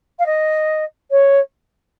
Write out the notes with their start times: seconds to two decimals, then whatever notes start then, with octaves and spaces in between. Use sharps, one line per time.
0.19 F5
0.26 D#5
1.11 C#5